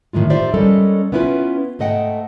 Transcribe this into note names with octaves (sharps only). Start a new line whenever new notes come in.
A2 D#3 E3 G#3 F4
D#4 F4 G4 C5 D5 E5
G3 G#3 C#4 A4 A#4
B3 C#4 E4 F4 B4
G#2 A3 D#5 F#5 G5